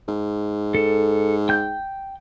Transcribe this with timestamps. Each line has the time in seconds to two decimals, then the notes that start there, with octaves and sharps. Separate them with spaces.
0.08 G#2
0.75 A4
1.49 G5 G6